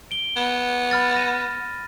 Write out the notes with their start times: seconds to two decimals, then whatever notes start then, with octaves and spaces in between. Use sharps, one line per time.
0.11 D7 G7
0.36 B3
0.91 B5 F6 A6
1.14 F6 A#6 D#7